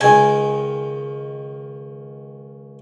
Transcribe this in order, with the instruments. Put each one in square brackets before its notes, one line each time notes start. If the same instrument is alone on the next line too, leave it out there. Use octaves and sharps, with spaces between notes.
[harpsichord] C#2 D#3 [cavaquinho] G#5